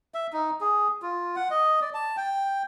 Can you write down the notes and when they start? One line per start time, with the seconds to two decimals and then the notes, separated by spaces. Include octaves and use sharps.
0.14 E5
0.33 D#4
0.61 G#4
1.02 F4
1.36 F#5
1.50 D#5
1.82 D5
1.94 A5
2.17 G5